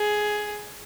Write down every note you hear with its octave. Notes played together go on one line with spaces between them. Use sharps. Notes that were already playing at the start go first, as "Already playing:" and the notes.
Already playing: G#4